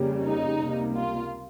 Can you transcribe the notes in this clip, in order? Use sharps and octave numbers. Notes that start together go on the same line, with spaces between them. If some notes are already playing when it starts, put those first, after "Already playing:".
Already playing: F2 C#3 G3 A#3
D#4
C#2 C3 G3 A#3
F4